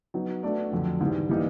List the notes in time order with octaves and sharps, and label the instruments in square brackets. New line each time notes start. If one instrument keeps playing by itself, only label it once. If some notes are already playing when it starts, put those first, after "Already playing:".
[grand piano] F#3 B3 D#4
A3 D4 F#4 B4 D5
F2 D3 F#3
G#2 E3 G3
E3 G3 A#3 D#4